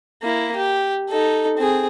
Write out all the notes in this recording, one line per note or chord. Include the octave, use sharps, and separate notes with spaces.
A#3 E4
G4
D#4 A4
C4 G#4